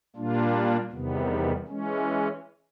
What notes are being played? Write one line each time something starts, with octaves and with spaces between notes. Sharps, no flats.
A#2 G3 A#3 D4 F4
E2 C3 D#3 G3 B3
E3 G#3 C#4